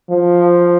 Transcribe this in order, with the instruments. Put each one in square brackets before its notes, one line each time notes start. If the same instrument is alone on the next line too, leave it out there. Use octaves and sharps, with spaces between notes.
[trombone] F3